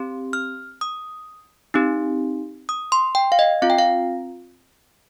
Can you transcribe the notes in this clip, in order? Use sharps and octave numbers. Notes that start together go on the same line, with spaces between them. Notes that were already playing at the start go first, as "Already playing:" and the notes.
Already playing: C4 G4
F6
D#6
C4 D#4 G4
D#6
C6
G5
F5
D#5
C4 F4 F5
G5
F5